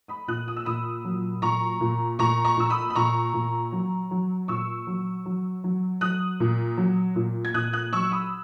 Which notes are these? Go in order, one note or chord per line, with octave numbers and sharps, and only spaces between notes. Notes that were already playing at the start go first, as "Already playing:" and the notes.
B5 D#6
A#2 D#6 F#6
D#6
E6
A#2 B5 D#6
F#3
A#2 A#5 C#6
A#2
A#2 A#5 C#6
A#5 C#6
A#2 E6
B5 D#6
B5
A#2 A#5 C#6
A#2
F#3
F#3
A#2 C#6 E6
F#3
F#3
F#3
F#3 D#6 F#6
A#2
F#3
A#2
G#6
A#2 D#6 F#6
D#6 F#6
F#3 C#6 E6
B5 D#6